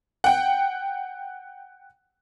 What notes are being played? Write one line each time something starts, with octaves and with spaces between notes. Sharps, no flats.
F#5 G5